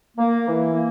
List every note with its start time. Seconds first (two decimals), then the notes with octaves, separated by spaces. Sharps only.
0.18 A#3
0.47 E3
0.74 A#3